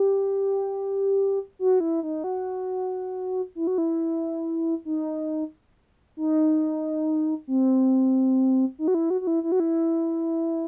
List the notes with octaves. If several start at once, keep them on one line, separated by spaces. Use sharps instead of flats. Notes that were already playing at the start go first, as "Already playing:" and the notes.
Already playing: G4
F#4
E4
D#4
F#4
E4
F#4
E4
D#4
D#4
C4
D#4
F#4
E4
F#4
F#4
E4
E4
F#4
E4